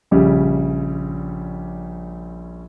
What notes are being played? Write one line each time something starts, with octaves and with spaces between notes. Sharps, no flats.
A#1 C#3 G3